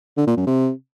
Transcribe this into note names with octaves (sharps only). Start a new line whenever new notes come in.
D3
A#2
F#2
C3